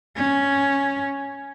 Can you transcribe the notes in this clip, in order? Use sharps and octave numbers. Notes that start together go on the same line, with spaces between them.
C#4